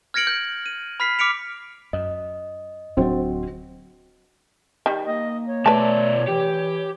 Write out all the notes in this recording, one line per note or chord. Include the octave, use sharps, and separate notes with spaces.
F6 G#6 A#6 C#7 D7 F#7
G6
D#7
B5 F6 B6 C7
D6 F6 B6 C#7 D7 F7
F#2 D#5
D1 F#3 C4 D4 F#4 C5
D#3 G3
A#3 D#5
C#5
B2 A3 B4 D5 A5
E3 G4